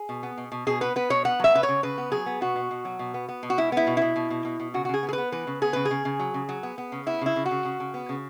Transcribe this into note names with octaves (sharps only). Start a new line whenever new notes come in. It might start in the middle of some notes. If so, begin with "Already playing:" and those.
Already playing: G#4
B2
B3
B2
B2
B2 G#4
B3 B4
B3 B4
B2 C#5
B3 F#5
F#3 E5
C#3 B4
C#5
C#3
C#3 B4
B3
F#3 G#4
B3
B2 F#4
B2
B2
F#3
B2
B3
B3
B2
F#4
G#3 E4
B3 E4
B2
B2 E4
B2
B2
B2
B2
C#3 F#4
F#4
C#3 G#4
B3
G#4
B3 B4
E3 B4
C#3
B3 G#4
C#3 B4
G#4
C#3
C#3
F#3
C#3
F#3
B3
B3
C#3
B3 E4
C#3 E4
C#3
F#4
C#3
C#3
C#3
B3
C#3